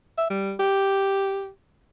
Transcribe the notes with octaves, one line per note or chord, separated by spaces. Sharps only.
E5
G3
G4